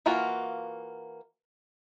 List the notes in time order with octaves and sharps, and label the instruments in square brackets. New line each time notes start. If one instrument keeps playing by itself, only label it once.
[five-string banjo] E3 A#3 F4 F#4